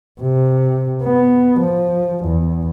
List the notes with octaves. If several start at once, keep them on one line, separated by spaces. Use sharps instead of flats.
C3
B3
F3
E2